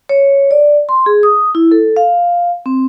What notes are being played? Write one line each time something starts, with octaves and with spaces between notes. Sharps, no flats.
C#5
D5
C6
G#4
D#6
E4
A4
F5
C4